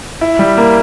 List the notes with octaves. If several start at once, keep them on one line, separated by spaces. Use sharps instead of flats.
E4
G3
A#3